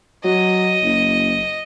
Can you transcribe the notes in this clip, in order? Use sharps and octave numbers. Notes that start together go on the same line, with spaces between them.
F#3 D#5
F#1